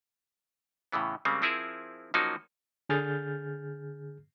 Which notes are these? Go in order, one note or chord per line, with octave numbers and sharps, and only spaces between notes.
A2 C#3 E3 B3
C#3 G3 G#3 A#3 C4
F3 C4 E4 G#4 A#4 E5
F3 F#3 A#3 C#4 D#4 F#4
D3 G#4 F6 G6 A6